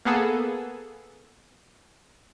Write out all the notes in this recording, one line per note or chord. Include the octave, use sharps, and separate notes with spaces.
A#3 B3 G#4 A4